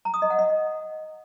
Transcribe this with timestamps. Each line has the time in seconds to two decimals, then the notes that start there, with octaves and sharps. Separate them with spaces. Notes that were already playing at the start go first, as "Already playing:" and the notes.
0.05 A#5
0.14 D#6
0.22 D#5
0.30 F#5
0.39 D#5